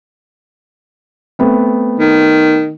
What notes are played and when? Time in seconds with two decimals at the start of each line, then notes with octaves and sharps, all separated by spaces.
1.39 A3 B3 C4
1.99 D#3